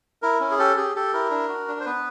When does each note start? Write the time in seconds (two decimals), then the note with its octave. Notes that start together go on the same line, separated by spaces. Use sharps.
0.22 E4 A#4
0.41 C#4
0.51 G#4
0.59 G4 A4
0.77 G4 G#4
0.95 G4 A4
1.14 E4 A#4
1.31 D4
1.49 F#4
1.68 D4
1.80 C5
1.85 B3 B4